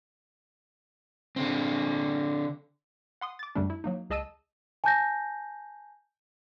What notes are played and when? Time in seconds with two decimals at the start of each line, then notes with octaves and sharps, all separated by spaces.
1.36 D3 C4
3.21 F#5 C6 D#6
3.39 D6 A6
3.55 F#2 D3 G3 A3 D4
3.70 E4
3.84 F#3 A#3 D#4
4.10 C#2 G#4 D#5 A5 E6 D#7
4.84 G#5 A5 G6 A#6